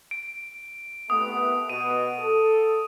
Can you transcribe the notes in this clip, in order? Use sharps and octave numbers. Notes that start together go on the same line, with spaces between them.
D7
C2 A3 B3 D#6
B2 D#7
A4